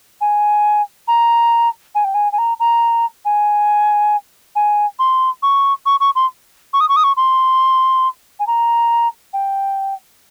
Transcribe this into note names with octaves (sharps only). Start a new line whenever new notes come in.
G#5
A#5
G#5
G5
G#5
G#5
A#5
A#5
G#5
G#5
C6
C#6
C#6
C#6
C6
C#6
D#6
C#6
D#6
C#6
C6
G#5
A#5
G5